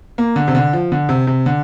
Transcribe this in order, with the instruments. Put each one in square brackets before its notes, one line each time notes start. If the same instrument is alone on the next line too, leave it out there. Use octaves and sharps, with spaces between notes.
[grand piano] A#3
D3
C3
D3
F3
D3
C3
C3
D3